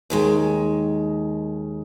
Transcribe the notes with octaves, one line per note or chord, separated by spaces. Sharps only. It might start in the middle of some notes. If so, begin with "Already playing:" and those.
D#2 D#3 G#3